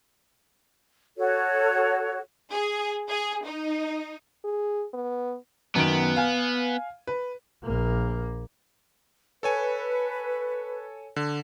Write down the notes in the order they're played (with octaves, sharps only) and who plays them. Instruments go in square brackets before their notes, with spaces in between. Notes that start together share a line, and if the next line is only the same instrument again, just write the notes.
[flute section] F#4 A4 C#5
[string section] G#4
G#4
D#4
[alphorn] G#4
B3
[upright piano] F#2 D#3 D7 [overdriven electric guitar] B3
[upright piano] F5 G#5
B4
[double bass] A#1 A#3
[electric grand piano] A4 C#5 G#5 [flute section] B4
[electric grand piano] D3